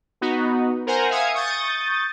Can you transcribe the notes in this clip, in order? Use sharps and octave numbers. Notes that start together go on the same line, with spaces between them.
B3 D#4 F#4
A#4 C5 F#5 G#5 A#5
E5 F5 G#5 D#6 G#6 C#7
C#6 D#6 G6 A6